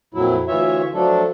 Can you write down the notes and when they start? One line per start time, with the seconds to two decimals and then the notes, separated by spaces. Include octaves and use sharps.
0.14 F2 A#2 F#3 E4
0.48 D2 E3 F4 C#5 E5
0.94 F3 F#3 A3 D4 A4